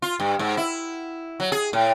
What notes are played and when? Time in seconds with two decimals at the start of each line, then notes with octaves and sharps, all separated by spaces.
0.02 F4
0.20 G2
0.39 G#2
0.57 E4
1.40 F#3
1.52 G#4
1.73 A2